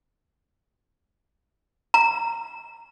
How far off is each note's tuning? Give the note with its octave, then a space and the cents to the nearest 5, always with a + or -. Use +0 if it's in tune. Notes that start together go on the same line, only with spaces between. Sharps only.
A#5 -20